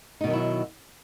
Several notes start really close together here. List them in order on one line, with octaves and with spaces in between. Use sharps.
D#4 B2 D#3 F#3 E4